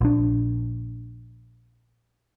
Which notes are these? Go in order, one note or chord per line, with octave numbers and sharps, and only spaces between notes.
A#1 D4